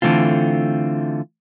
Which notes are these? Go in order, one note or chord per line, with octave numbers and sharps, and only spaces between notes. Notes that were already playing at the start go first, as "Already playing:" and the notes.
D3 E3 A3 C4 F4